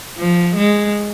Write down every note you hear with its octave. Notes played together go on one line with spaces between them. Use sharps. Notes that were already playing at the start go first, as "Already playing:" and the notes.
F3
G#3